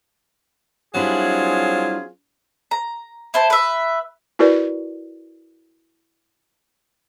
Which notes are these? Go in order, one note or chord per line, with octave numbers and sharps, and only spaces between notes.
F#3 G3 C4 D4 E4 F4 G#4
A#5
E4 C5 A5
B4 E5
E4 F#4 A#4 B4 D5